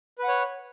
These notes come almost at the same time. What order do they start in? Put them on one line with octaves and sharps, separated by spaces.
B4 F#5 C#5